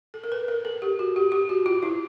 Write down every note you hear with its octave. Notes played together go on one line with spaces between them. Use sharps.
A4
A#4
B4
A#4
A4
G4
F#4
G4
G4
F#4
F4
E4